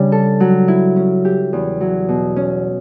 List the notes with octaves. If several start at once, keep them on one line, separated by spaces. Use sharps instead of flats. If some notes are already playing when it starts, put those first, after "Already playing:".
Already playing: C#3 G3 D4
A4
F#3
E4
C#4
G4
E2
F#3
B2
C#4